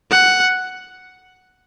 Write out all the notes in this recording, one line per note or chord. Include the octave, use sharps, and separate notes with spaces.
F#5